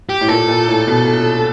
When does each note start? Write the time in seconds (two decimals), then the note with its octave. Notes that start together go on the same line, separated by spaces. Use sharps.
0.09 G4
0.21 A2
0.29 A#2 A4
0.48 A#2
0.68 A2
0.87 B2